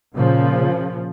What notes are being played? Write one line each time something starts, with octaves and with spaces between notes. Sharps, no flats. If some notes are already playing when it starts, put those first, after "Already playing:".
A#2 C#3 F3